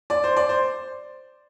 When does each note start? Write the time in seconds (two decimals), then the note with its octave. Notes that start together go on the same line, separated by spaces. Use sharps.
0.10 D5
0.24 C5
0.36 D5
0.49 C5